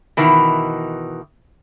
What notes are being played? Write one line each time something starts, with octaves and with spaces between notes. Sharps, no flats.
B2 D#3 E3